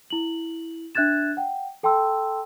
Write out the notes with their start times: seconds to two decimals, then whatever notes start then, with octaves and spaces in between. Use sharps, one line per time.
0.10 E4 F#7
0.95 D4 E5 F#6 G#6 A6 E7
1.37 F#5 G5
1.83 A4 G5 A5 C6 E6